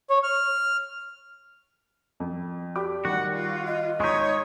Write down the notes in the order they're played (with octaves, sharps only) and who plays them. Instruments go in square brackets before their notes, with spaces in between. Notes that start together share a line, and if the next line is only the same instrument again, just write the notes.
[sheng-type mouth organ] C#5
F6
[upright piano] F2
[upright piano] G4 B5 D6 [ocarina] D5
[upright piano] D#3 G3 [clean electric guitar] F#4 [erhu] F#5
[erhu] F4
[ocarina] D#5
[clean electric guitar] G#3 D#4 [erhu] C#5 [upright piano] C#6 B6